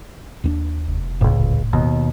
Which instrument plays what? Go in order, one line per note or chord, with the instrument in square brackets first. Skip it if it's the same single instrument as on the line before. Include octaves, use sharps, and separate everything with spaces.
[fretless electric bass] D#2 C4 D4
[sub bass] F1
[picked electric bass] D#1 C#2 [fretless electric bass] A2
[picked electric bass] D#2 B2